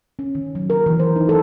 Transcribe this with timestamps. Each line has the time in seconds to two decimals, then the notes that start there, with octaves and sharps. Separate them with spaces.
0.19 C#4
0.35 D#3
0.55 F#3
0.70 A#4
0.86 E3
1.00 C5
1.16 D#4
1.29 A4